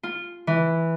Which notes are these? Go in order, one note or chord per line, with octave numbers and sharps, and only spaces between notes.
F4
E3